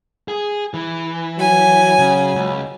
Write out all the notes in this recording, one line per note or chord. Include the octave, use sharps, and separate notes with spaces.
G#4
E3
F#3 G#5
C#3
C#2